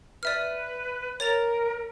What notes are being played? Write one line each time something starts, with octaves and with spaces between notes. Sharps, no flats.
B4 D5 E5 F6
A#4 C#5 A6 F7